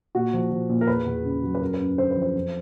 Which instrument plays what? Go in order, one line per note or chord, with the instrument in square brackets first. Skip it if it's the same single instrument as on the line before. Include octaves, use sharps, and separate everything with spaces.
[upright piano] A#2 F#4
F3
F3
A#2
A#4
E2 B4
E2
C#3
F#3
B4
F#2 A#4
B4
F#2
D3 C5
B4
F3
C5
F2